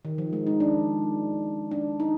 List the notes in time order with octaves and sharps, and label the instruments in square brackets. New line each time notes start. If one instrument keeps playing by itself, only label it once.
[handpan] D#3
F3
G#3
D#4
D4
D4
D#4